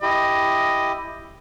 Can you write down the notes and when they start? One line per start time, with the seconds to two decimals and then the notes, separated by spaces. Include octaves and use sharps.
0.02 E4 G4 D#5